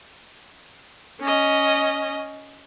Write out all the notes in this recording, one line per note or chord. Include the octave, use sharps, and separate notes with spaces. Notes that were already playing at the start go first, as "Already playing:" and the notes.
C#4 D#5